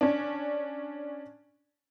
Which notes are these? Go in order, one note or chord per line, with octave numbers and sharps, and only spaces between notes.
C#4 D4